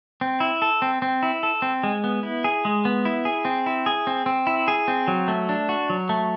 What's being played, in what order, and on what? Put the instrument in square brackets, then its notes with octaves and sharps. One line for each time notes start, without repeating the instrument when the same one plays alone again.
[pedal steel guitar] C4
E4
A4
C4
C4
E4
A4
C4
G#3
B3
E4
G#4
G#3
B3
E4
G#4
C4
E4
G#4
C4
C4
E4
G#4
C4
F#3
A3
D4
F#4
F#3
A3